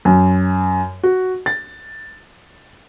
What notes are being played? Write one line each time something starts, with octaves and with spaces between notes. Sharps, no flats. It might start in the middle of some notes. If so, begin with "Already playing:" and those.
F#2
F#4
A6